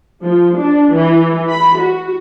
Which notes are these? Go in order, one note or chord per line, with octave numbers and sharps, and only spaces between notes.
F3
D4
E3
B5
F#4